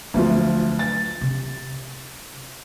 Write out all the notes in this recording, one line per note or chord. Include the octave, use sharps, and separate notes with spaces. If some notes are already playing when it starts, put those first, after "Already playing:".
D2 F3 F#3 A3
A6
C3